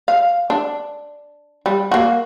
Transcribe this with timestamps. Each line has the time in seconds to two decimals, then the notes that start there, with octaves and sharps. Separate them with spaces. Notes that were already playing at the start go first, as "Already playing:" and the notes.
0.08 F5
0.50 D4
1.66 G3
1.91 A#3 F#4